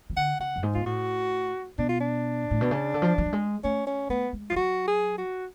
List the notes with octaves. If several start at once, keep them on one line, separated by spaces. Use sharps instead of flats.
F3
D3 F#5
C#3 F#5
F#2
G#2
B2 F4
A2 F#4
B2 D4
F4
D4
A2
B2
C#3
D3
F3
F3
F#3
G#3
A3 C#4
C#4
A3 B3
G#3
F3 F4
F#3 F#4
G#4
F#4